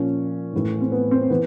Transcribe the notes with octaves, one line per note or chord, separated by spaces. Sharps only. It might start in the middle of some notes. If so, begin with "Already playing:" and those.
Already playing: A#2 F3 C#4
A2 E3
C4
B3
C4
E3 B3